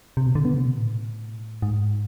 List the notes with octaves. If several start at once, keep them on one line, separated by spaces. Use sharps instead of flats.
C3
B2
D3
B3
C3
B2
A2
G#2